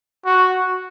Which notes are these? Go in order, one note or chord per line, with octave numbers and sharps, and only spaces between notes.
F#4